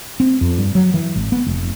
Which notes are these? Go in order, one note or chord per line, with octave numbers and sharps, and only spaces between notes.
C4
F2
G2
F#3
E3
G#1
B3
F1